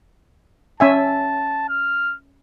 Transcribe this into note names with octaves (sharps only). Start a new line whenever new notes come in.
C#4 E5 G#5 A5
F6